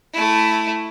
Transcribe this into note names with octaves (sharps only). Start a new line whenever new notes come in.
A3 E4